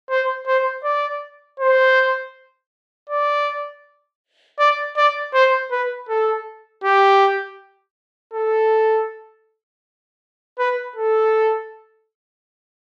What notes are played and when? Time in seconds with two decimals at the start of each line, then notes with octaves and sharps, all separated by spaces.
0.10 C5
0.47 C5
0.84 D5
1.60 C5
3.09 D5
4.59 D5
4.97 D5
5.34 C5
5.71 B4
6.09 A4
6.84 G4
8.34 A4
10.59 B4
10.96 A4